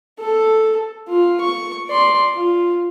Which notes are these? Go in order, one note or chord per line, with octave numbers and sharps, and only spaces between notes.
A4
F4
C#6
D5 C6
F4